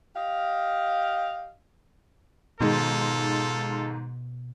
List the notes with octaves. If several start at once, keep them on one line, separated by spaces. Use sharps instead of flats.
G4 D#5 F5
G#2 B2 D#3 G#3 F4 A4